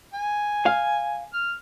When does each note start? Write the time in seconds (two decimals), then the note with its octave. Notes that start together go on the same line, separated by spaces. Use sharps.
0.14 G#5
0.66 F5
1.33 F6